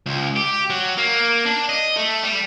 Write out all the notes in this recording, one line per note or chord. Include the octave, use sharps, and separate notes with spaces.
C#2
G4
F#3
A#3
D4
D#5
A3
G3